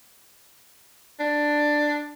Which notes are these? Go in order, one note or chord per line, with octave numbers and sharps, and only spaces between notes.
D4